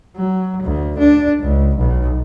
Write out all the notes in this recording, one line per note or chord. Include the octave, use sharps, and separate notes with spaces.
F#3
D2
D4
C#2
B1